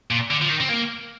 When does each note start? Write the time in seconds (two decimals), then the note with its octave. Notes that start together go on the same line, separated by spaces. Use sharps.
0.10 A#2
0.31 D3
0.42 F3
0.50 D#3
0.60 C4
0.69 A#3